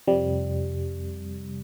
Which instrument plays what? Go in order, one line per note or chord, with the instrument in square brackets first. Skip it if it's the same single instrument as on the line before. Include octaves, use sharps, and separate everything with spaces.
[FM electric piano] F2 C3 G3